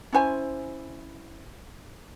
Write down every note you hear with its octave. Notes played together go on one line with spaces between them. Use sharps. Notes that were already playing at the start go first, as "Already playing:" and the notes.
C#4 E4 C5 G#5